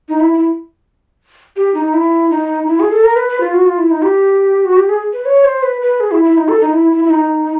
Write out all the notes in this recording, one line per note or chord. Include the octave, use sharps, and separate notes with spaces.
D#4
E4
E4
G4
D#4
E4
D#4
E4
G#4
A4
A#4
B4
B4
F4
F#4
F4
E4
D#4
G4
F#4
G4
G#4
B4
C#5
C5
B4
B4
G#4
E4
E4
D#4
A4
D#4
E4
E4
E4
D#4